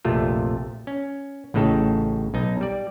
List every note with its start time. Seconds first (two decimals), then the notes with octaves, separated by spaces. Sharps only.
0.05 A#1 F2 C3 A3 F4
0.87 C#4
1.54 A1 A2 C#3 D#4 A4
2.34 B1 D#4
2.61 G3 D5